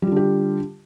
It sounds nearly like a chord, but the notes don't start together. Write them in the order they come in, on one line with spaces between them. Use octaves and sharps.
G3 F4 D3 G4